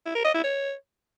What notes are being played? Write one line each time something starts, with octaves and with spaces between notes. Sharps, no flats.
E4
A#4
D#5
E4
C#5